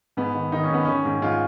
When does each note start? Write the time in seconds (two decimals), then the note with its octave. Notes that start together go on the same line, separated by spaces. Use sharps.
0.17 G#2 B3
0.35 D#3
0.52 D#3 D#4
0.63 C#4
0.70 G#2 B3
0.85 D#3 C#4
1.05 G#2
1.22 G#2 F4